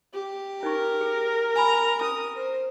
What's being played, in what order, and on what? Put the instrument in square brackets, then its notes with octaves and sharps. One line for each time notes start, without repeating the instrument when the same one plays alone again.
[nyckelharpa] G4
[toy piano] C#4 D#4 C#6 [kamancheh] A#4
[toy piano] G#4
[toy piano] G#5 B5 [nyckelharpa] A#5
[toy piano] C#4 [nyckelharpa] D#6
[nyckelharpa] C5